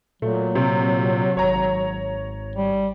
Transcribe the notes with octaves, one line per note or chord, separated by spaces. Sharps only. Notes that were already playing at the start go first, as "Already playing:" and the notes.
A#2 F#3 A3
C3
G#1 C#5 A#5
G3